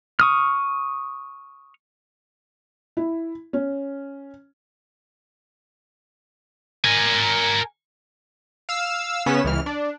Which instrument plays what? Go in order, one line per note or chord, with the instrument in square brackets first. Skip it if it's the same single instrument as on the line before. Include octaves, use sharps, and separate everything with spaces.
[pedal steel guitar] C#6 D#6 F6
[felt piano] E4
C#4
[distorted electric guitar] A#4 G#5
[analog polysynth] F5 E6
C#3 B3 C#4 B6 E7
C#2 E3 F6
D4